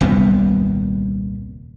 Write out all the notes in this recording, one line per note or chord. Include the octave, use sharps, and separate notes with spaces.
D#1 C2 F#2 B3